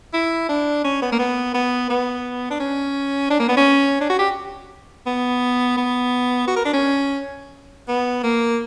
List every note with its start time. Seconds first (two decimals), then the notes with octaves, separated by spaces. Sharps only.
0.14 E4
0.49 D4
0.85 C#4
1.02 B3
1.12 A#3
1.19 B3
1.54 B3
1.90 B3
2.51 D4
2.60 C#4
3.30 D4
3.40 A#3
3.49 B3
3.57 C#4
4.01 D4
4.10 F#4
4.19 G4
5.07 B3
5.77 B3
6.48 F#4
6.56 A#4
6.65 D4
6.73 C#4
7.88 B3
8.23 A#3